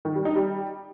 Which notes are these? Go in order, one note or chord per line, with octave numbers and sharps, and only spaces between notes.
D#3
G3
D#4
G3